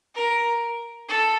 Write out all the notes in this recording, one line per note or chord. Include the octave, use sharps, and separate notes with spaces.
A#4
A4